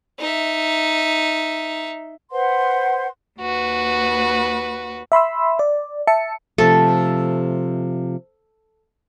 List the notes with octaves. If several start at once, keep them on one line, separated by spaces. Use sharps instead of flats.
D#4 E5
B4 C5 F#5 C6
D#2 F#4 B4
E5 B5 C6 E6
D5
E5 A5 C#7
C3 F3 A3 A4